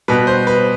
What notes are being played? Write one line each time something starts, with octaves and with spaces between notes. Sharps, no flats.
B2 G3 B4
C5
B4